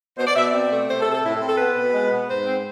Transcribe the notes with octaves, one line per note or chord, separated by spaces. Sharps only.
B2 C5
D5
B2 E5
D5
C4
A3
C3 C5
A4
C3
A4
A2 E4
A4
C4
A4
B3 B4
B2
G#3
B3
G#2 C5
C4